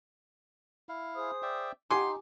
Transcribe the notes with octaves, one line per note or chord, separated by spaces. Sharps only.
E4 F5
G#4 C5 D#6
D5 E5 G5
D#4 G4 F#5 G#5 C6 D6